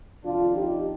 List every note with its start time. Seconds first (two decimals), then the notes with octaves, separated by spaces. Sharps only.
0.24 F2 C3 D#3 D4 F4
0.54 D#4 G4